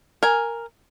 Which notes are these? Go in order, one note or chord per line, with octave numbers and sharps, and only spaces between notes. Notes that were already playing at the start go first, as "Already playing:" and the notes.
A#4 G#5